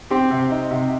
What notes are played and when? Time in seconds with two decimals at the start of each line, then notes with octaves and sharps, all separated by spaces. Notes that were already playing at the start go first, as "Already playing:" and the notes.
0.10 C4 G4
0.31 C3
0.51 D#4
0.71 C3